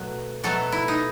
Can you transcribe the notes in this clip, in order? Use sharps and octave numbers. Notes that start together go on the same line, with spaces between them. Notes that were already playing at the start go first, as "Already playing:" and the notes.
Already playing: B2 F#3 A3
B2 F#3 A3 A4
E4
D#4